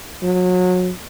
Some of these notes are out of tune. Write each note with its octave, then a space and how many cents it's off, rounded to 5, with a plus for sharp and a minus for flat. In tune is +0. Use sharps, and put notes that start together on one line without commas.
F#3 -30